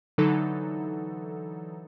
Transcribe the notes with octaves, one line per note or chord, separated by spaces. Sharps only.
D3 E3 F#3 D#4 A4